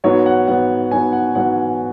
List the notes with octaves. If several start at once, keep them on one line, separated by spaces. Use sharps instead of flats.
G#2 F#3 B3 C#5
F#5
G#2 F#3 B3 F#5
G#2 F#3 B3 G#5
F#5
G#2 F#3 B3 F#5